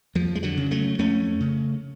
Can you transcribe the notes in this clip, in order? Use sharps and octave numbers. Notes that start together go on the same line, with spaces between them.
F2 F3
G#3
D3 F#3
C#3
F#3 A3
F2 A3 C#4
C#3